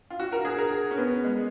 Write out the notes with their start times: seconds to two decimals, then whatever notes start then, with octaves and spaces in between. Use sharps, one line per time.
0.10 F4
0.20 F#4
0.32 A#4
0.45 G#4
0.58 A#4
0.91 C#4
0.98 B3
1.24 G#3